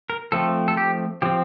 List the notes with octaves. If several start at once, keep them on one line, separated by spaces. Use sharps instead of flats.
A#4
F3 A3 C4 A4
A4
G4
F3 C4 G4